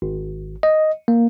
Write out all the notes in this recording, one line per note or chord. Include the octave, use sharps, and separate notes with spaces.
G#1
D#5
A#3